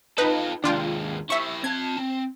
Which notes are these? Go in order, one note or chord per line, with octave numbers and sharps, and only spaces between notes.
D#4 F4 A4 B4
D#2 G#3 D4 F4 G5
E4 C5 E5 C#6
C4 A5 G#6
C4